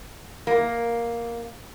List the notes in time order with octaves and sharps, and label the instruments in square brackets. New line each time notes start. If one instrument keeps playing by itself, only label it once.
[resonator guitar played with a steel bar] A#3